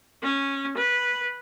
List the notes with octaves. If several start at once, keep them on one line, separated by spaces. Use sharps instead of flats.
C#4
B4